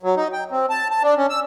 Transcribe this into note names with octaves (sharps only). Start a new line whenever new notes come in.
F#3
D#4
G5
C4
A5
A5
D4
C#4
E6